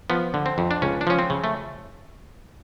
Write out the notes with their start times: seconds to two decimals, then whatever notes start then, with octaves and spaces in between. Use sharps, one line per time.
0.10 F3 B3
0.34 D3
0.46 C4
0.58 F2
0.71 D4
0.82 C#2 C#4
1.01 D4
1.07 F3 C#4
1.19 C4
1.30 C#3
1.44 A3